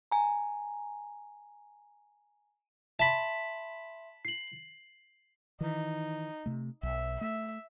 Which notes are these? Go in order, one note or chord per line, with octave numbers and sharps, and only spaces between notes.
G#5 A#5
E5 A5 B5 C6
C7 F#7
D#3 E3 D#4
C3 A3
B1 E5
A3 E5